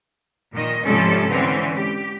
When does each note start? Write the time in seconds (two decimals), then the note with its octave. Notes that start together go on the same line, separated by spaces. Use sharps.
0.52 A#2 D#3 D#5
0.83 G#2 C3 F3 G3 C#4 A4
1.28 D3 E3 G#3 C4 C#4
1.75 G4